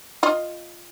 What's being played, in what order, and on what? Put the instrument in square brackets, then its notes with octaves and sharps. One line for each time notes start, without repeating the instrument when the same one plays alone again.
[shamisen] F4 D#5